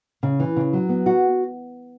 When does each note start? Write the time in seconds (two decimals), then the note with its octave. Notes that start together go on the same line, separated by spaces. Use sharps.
0.23 C#3
0.40 E3
0.56 C#3
0.73 F#3
0.89 B3
1.06 F#4